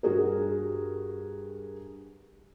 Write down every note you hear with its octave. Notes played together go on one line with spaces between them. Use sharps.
G2 F#4 G#4 A#4